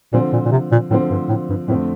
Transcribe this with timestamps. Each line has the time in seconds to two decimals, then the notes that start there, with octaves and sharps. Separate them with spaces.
0.13 A#2 D3 F3 C4
0.33 A#2
0.45 A#2
0.51 C3
0.71 A#2
0.90 A2 D3 F3 C4
1.10 G2
1.29 A2
1.49 G2
1.68 F2 A2 D3 A3 C4